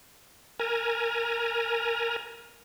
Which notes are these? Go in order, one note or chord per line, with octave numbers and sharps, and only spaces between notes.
A#4 G#5 A#5